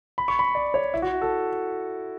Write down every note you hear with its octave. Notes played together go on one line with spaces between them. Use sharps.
B5
C#6
B5
D5
C#5
E4
F#4
A4